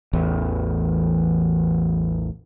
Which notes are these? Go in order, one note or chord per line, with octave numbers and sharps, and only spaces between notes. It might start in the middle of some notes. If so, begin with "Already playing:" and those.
A1 E2